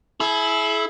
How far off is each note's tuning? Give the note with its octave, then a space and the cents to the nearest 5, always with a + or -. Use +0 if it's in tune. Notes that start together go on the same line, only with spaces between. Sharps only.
E4 +0 G#4 +45